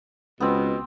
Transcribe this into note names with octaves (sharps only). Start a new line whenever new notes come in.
C#2 B2 B3 C4